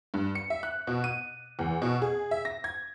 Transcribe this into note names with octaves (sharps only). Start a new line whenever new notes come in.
G2
C#7
E5
F#6
B2
D#7
E2
B2
G#4
E5
A#6
G#6